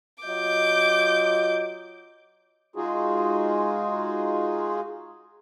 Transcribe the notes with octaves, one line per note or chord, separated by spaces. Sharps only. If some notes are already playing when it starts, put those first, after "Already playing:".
F#3 F4 D#5 D6 G6
G#3 D#4 F4 F#4 G#4